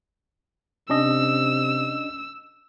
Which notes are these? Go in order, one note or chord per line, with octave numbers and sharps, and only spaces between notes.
C3 C#4 D4 D#5 E6